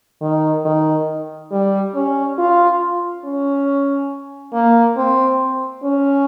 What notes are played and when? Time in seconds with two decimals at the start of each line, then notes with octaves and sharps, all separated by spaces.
0.22 D#3
0.65 D#3
1.51 G3
1.94 C#4
2.38 F4
3.25 C#4
4.53 A#3
4.97 C4
5.83 C#4